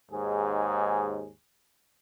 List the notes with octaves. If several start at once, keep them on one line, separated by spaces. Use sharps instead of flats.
D#2 G#2 G#4